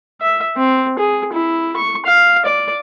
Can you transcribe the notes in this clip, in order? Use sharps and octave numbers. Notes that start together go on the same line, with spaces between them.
E5
C4
G#4
E4
C#6
F5
D5